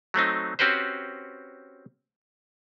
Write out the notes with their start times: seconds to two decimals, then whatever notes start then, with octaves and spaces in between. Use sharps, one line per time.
0.14 F#3 A3 C4 D#4
0.59 C4 C#4 F#4 G4 B4 C5